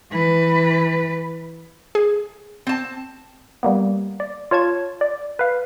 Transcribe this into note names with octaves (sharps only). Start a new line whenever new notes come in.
E3 B4
G#4
C4 A5
G3 A#3 B3
D5
F4 C#5 A5 G#6
D5
B4 F5